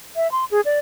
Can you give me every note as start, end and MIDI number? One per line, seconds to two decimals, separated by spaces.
0.16 0.30 76
0.32 0.45 84
0.51 0.61 68
0.65 0.79 74